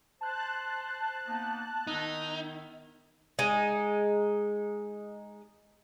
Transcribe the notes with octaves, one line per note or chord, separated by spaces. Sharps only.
C5 A5 F#6
A#3 B3 D#4
D#3 B3 D#4 E4
G#3 D#4